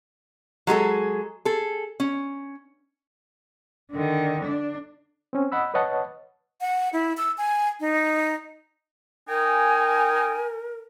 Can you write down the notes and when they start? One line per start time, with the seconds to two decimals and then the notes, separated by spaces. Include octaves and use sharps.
0.67 F#3 G#3 G#4 A4
1.45 G#4 A4
2.00 C#4
3.92 D3 D#3
4.45 D4
5.33 C4 C#4
5.52 D#5 F#5 B5 E6
5.74 B4 C#5 D#5 F#5 A5
6.61 F#5
6.93 E4
7.17 E6
7.38 G#5
7.80 D#4
9.29 D#4 A#4 G5 G#5